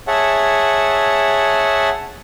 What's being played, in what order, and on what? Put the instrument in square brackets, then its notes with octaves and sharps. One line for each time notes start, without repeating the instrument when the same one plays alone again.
[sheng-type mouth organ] G#4 C#5 E5 F#5 A5